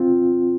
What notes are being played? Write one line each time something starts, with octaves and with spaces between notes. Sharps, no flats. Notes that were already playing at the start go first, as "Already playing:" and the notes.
Already playing: C4 F4